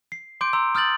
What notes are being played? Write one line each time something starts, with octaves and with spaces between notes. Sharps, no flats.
C7
C6 D6 G6 D7
A#5 C6 E6
D#6 F6 G6 A6 F#7